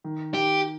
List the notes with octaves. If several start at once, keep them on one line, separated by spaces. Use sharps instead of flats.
D#3
D#3 G4